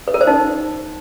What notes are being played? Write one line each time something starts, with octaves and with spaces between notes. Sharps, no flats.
B4
A#4
C5
D#4